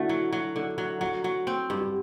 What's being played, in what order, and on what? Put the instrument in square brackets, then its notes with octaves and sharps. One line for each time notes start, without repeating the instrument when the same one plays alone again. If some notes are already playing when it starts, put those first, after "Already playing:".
Already playing: [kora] D3 A3 D4 [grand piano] E4 F#4
[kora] F#3
F#3
D3
F#3
[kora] F#3 [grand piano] F#4
[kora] F#3
C4
G2
[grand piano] G4